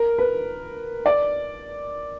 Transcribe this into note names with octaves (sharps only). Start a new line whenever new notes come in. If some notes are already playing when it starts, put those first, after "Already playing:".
Already playing: A#4
B4
D5